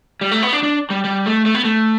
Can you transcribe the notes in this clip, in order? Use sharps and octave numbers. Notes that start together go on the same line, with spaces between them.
G3
A3
B3
D4
D4
G3
G3
A3
A3
B3
A3